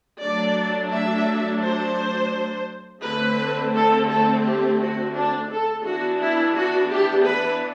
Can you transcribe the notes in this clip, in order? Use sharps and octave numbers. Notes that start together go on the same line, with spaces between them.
F#3 A3 D4 D5
E5
C5
D3 A3 C4 B4
A4
A4
G4
F#4
D4
A4
E3 B3 D4 F#4
E4
F#4
G4
B4